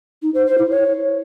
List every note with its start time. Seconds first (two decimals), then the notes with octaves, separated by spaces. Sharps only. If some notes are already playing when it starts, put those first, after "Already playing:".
0.22 D#4
0.34 C5
0.46 C5
0.58 E4
0.70 C#5